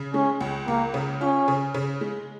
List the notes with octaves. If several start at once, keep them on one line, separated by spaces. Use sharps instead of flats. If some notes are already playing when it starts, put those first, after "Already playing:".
Already playing: C#3
G#3 C#4
C#2
C#2 A#3
C#3
C#4 F4
C#3
C#3
G#3